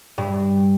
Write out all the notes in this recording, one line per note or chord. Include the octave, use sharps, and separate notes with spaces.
G2